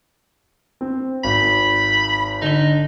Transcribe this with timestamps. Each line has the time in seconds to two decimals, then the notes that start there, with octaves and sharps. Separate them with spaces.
0.81 C4
1.24 G#1 B5
2.42 D3 D#4 G7